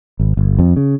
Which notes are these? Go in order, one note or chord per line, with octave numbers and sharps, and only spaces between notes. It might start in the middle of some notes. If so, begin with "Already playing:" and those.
G#1
G1
F2
C#3